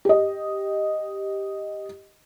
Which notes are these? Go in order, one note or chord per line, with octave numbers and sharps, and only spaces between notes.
G4 D#5